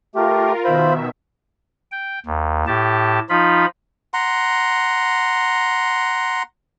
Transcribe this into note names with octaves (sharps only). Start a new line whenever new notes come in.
A3 F4 G4 A#4
B2 D#3 F4 C5 E5 B5
G5
D#2
A2 G4 A5
F3 D#4 F4 B5
F#5 A#5 C6